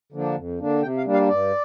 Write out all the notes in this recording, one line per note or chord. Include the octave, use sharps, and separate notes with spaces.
D3 F3 A#3 D4
F2
D3 A#3 D4
C3 G5
F5
G3 A#3 D4
F5
G2 D5